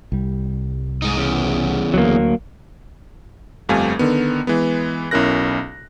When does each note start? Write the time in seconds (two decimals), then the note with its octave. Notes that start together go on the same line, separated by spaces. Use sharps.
0.12 C2 G3
1.02 G#2 D#4
1.17 E2 C#3
1.94 D2 F#3 A#3
3.69 G1 F2 G3 A3 F5 G#5
3.99 D3 D#3 B3
4.47 E3 G#3 B3
5.11 B1 C#4 E4 A#4 F#6 A#6